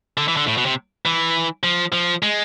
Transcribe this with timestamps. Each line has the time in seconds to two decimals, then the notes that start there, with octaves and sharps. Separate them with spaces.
0.17 D3
0.28 E3
0.37 D3
0.47 A2
0.57 B2
0.66 C3
1.05 E3
1.63 F3
1.93 F3
2.23 G#3